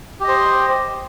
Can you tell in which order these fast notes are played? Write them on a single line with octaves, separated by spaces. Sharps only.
G4 D#5 C5